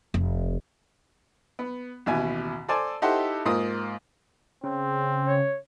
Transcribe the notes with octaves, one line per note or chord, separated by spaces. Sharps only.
F1
B3
A1 D#2 B2 E4 G#5
A4 C5 D5 G#5 A5
D#4 E4 G4 A4 C5 F#5
G#2 A#3 F4 D#6
C#3 C4
C#5